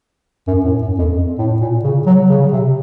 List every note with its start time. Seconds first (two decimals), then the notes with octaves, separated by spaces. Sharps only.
0.47 F#2
0.65 A2
0.82 F#2
0.99 F2
1.38 A2
1.61 A#2
1.84 C#3
2.06 F#3
2.29 C#3
2.52 C3